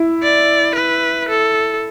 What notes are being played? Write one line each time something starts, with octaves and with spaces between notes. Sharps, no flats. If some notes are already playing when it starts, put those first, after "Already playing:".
Already playing: E4
D5
B4
A4